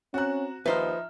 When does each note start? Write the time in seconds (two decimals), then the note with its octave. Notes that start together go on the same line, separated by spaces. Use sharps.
0.14 C4 C#4 F#4 A#5 F#6
0.66 D#2 F3 D#4 B4 C5 E5 A#5 F6